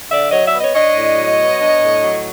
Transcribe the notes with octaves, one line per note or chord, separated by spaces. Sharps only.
D3 D5 E5
F#3 C#5 D#5
D5 E5
B3
C#5 D#5
D4 C#5 D#5
A2
F#3
B3
D4
A2
F#3